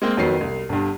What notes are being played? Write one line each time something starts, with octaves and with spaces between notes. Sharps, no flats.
G#3 A#3 C4
F2 D#3 F#3 B3 C7
C2
G1 G2